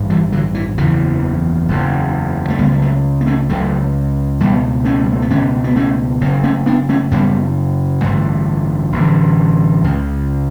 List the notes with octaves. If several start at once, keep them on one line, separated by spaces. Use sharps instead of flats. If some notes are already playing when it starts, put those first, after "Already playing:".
Already playing: A1 G2
E3 G3
D3 F#3
E3
F#1 E2 C#3 E3
F#1 E2 C#3
A3
C#2 C#3 G3 B3
G3
F#3 A3
B3
A3 C#4
C#2 C#3 F#3 A3
C#2 B2 G3 B3
A3 C#4
G3
A3
B3
C#2 B2 A3 C#4
B3
A3 C#4
F#1 F#2 C#3
A3 C#4
B3 D4
A3 C#4
F#1 F#2 C#3 G3 B3
A1 G2 D3 F#3 A3
A1 G2 D3
C#2 C#3